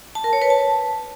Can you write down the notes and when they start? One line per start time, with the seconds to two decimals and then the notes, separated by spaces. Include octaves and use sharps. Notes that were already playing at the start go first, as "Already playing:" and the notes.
0.15 A5
0.24 A#4
0.33 C#5
0.42 B4
0.50 A5